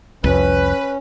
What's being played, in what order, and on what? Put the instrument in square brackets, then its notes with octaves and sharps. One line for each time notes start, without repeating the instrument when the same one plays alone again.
[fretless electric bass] C2 F2 [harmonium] C#4 [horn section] B4